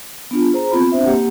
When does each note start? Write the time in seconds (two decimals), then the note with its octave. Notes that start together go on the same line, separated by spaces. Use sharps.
0.31 B3 D4 F4
0.53 G#4 C5 A#5
0.71 B3 C4 F4 B5
0.92 C4 D4 C5 E5
1.05 A#3 G4 F#5